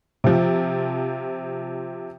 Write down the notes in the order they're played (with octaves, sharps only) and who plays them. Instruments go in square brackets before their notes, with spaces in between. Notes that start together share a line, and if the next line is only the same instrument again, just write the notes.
[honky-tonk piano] C3 F3